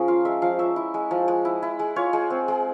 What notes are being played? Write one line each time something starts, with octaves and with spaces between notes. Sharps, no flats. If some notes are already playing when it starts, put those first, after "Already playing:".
Already playing: F3 C#4 G#4 A#4
F4 F5
G#3 E5
F3 F5
C#4 E5
E4
G#3
F3
G#3
E4
E4
G#3
F4 C#5
G#3
C4
G#3